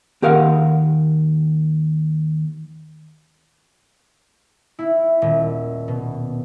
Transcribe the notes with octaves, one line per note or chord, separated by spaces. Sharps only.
D#2 G4 A#4 F5 F#5
E4
D#1
B2